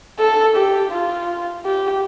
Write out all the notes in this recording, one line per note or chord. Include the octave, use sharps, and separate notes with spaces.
A4
G4
F4
G4